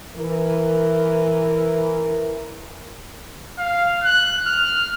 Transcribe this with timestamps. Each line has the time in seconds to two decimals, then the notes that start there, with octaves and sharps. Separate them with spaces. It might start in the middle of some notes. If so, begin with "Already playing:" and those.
0.16 E3 A#4
3.58 F5
4.03 F#6
4.46 F6